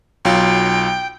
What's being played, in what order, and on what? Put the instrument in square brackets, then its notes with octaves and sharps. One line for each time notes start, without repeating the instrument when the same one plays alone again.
[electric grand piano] B1 F#3 F4 [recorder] G5